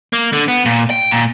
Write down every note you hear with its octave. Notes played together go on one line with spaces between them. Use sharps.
A#3
D3
B3
A#2
G5
A#2